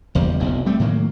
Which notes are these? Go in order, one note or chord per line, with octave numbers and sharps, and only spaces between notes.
F#1 E2 G3
F1 B1 E2
G3 A3 C4
A2 D#3 F#3 A#3